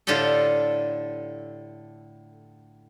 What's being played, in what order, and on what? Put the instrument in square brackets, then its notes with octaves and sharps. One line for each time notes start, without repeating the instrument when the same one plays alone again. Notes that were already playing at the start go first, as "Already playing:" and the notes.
[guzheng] A2 D3 F4 G4 A4